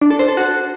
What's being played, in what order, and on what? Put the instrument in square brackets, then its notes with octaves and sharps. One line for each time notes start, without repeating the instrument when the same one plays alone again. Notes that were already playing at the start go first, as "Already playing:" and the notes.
[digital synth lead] D4
A4
C5
A4
F#4